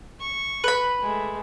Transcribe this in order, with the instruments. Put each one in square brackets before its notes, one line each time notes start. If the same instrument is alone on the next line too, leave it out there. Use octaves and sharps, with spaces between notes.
[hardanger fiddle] C#6
[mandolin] B4 B5
[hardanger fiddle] G#3 A3